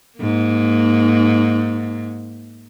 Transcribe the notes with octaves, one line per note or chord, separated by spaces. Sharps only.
G#2 A#3